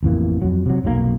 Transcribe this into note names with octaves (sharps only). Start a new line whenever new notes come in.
A1 F2 E3 A#3
F2 F#3
C3 F#3
F1 B1 A#2 A#3